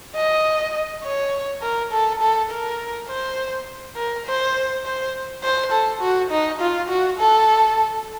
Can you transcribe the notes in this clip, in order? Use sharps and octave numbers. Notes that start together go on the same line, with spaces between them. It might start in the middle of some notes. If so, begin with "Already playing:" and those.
D#5
C#5
A#4
A4
A4
A#4
C5
A#4
C5
C5
C5
A4
F#4
D#4
F4
F#4
A4